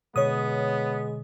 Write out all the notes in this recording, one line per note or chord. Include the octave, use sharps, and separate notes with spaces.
B2 D3 G#3 B3 C#5 D#6